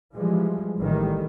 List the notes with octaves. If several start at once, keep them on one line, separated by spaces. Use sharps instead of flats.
E3 F3 G3 G#3
A1 D#3 G3